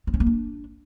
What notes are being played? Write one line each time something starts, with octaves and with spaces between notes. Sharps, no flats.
C4
C#4
A#3
D4